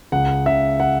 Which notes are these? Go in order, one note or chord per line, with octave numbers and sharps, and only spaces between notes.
C#2 F#5
C#3 E5
F#5